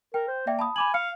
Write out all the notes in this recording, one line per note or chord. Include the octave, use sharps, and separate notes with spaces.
A#4 G5
C5
A#3 D5 E5 G5
A5 B5 D#6
G#5 B5 D6 F#7
F5 C#7